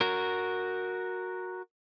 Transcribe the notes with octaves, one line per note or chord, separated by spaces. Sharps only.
F#4 A#4